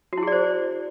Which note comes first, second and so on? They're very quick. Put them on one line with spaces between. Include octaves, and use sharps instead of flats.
F#4 E4 G#4 D5 C5